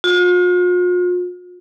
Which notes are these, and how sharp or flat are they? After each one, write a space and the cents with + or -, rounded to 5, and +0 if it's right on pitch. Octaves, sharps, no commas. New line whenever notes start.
F4 +45